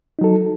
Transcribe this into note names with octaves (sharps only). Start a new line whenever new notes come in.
F#3 D#4 A4